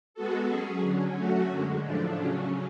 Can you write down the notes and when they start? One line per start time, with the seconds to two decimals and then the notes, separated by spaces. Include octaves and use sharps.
0.14 G#3 B3 F#4 A4
0.49 F#3 C#4 G#4
0.82 D3 F#3 C#4
1.16 F#3 A3 C#4 F#4
1.49 F#2 D3 G#3
1.84 A2 F3 A3 D4
2.17 C#3 F#3 C#4